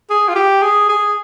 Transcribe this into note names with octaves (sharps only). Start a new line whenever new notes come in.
G#4
F4
G4
G#4
G#4